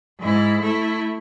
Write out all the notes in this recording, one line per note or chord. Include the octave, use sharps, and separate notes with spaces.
G#2 E4
A3 E4